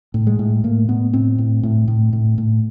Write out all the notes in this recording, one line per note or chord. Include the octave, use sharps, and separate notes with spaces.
A2
G#3
A2
A2 A#3
A2 B3
A2 C4
A2
A2
A2
A2
A2